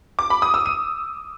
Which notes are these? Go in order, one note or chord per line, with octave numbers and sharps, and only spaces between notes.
D6
B5
D#6
E6
D#7